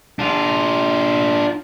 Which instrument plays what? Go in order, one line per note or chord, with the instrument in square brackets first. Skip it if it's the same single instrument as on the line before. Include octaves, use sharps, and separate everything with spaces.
[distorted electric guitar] D4 F4